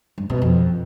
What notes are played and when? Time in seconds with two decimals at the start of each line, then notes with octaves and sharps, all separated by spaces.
0.18 G2
0.30 B2
0.42 F2